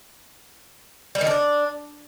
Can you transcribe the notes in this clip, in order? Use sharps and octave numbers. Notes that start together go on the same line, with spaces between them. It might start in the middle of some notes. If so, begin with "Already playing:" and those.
G3
D#3
D4